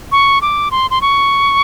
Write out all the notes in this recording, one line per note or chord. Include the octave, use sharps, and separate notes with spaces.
C#6
D6
C6
C6
C#6